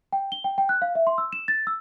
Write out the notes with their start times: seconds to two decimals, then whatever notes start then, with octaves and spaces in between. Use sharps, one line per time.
0.13 G5
0.32 G7
0.44 G5
0.58 G5
0.69 F#6
0.82 F5
0.95 E5
1.07 C6
1.18 E6
1.33 E7
1.48 A6
1.67 E6